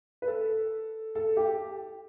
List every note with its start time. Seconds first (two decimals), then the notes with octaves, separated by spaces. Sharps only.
0.22 B4
0.28 A4
1.15 A4
1.37 G4